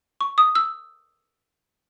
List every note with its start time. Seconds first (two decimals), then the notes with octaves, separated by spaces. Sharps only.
0.21 C#6
0.38 D#6
0.55 E6